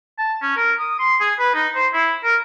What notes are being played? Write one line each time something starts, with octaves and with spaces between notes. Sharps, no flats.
A5
C#4
A#4
D#6
C6
G#4
B4
D#4
C5
E4
A#4